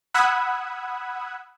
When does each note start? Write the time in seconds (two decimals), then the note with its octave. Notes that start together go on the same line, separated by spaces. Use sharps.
0.14 F#5 B5 D#6 E6 F#6 G#6